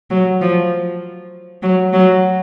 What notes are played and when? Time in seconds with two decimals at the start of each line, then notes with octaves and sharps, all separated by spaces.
0.11 F#3
0.41 F3
1.63 F#3
1.93 F#3